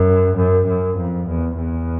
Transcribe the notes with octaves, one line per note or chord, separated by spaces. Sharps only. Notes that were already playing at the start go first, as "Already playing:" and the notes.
Already playing: F#2
F#2
F#2
F2
E2
E2